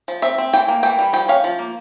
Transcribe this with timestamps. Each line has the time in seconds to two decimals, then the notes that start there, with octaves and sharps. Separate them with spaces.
0.08 F3
0.22 C4 E5
0.38 C4
0.53 E3 G5
0.68 A#3
0.83 E3 G5
0.99 G3
1.13 F3 G5
1.28 C#4 F5
1.44 F3
1.59 A#3